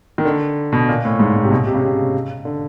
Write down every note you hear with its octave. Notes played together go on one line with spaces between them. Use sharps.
D#3
D3
B2
A#2
A2
G#2
A2
C3
B2
C3
C#3
C3
D3